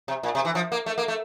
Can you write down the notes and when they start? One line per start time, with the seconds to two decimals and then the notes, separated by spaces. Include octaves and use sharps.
0.08 C3
0.23 A#2
0.35 C3
0.45 E3
0.55 F3
0.72 A#3
0.86 A3
0.98 A#3
1.08 A3